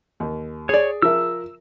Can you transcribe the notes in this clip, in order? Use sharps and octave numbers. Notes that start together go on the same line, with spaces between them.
D#2
G#4 C#5 D5
F3 A#4 E5 E6